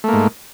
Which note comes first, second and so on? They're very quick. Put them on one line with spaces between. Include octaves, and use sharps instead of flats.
A3 A#3 G#2